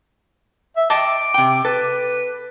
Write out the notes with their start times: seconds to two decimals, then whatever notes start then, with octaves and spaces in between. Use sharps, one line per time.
0.77 E5
0.90 D#5 G5 A5 D6
1.34 C3 G5
1.65 A4 B4